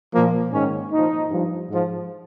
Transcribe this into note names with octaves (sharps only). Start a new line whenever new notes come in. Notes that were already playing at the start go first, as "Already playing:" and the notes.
A#2 F3 A#3
G#2 D#3 C#4
A#2 F3 D#4
G2 F3
G#2 F3